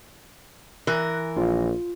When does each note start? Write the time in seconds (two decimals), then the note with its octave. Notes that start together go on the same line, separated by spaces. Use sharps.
0.87 E3 A#4 F#6
1.37 A#1 F4